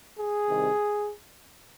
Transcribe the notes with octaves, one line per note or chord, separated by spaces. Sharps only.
G#4
C2 C3 D#3